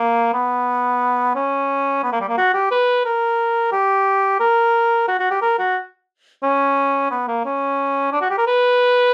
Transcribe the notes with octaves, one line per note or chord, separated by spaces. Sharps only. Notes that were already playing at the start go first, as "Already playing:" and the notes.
Already playing: A#3
B3
C#4
B3
A#3
G3
A#3
F#4
G4
B4
A#4
G4
A#4
F#4
F#4
G4
A#4
F#4
C#4
B3
A#3
C#4
D4
F#4
G4
A#4
B4